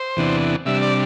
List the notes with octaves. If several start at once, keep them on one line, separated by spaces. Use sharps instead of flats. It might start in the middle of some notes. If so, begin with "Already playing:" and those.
Already playing: C5
E2 C3 E3 B3 D4
C3 G3 D4 E5
D5